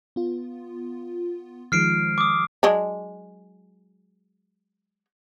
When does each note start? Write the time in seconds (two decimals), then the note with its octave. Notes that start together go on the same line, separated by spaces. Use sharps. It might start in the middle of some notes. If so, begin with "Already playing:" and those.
0.16 B3 F4
1.72 D#3 F3 G#3 F6 C7 D7
2.18 D6 D#6
2.63 F#3 G#3 D4